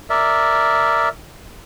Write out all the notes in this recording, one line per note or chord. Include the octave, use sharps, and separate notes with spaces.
A#4 D5 E5